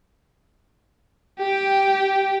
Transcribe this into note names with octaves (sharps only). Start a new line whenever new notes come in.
G4 G5